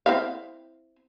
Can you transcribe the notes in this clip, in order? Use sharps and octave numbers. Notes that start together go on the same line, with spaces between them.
C4 E4 F5